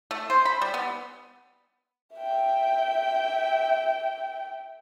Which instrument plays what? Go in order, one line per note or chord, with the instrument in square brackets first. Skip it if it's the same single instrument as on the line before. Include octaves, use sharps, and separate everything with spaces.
[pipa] A3
C5
B5
G3
B3
[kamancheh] E5 G5